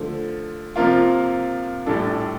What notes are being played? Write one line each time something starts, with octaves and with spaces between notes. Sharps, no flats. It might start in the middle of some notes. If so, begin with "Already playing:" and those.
Already playing: D3 F3 A3
C3 F3 A#3 F4
A#1 A2 G3 D4 A4